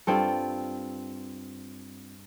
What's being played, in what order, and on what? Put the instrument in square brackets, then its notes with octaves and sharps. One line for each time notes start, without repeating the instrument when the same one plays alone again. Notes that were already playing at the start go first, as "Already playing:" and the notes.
[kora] G2 C4 F4 A4